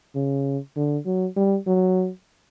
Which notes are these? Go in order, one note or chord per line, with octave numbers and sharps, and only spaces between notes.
C#3
D3
F#3
G3
F#3